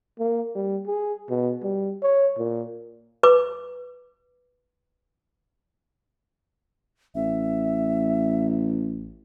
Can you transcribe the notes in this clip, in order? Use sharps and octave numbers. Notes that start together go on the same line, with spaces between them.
A#3
G3
G#4
B2
G3
C#5
A#2
B4 D6
A1 E5